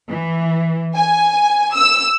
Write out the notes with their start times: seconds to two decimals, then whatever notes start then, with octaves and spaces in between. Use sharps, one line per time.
0.10 E3
0.96 G#5
1.75 E6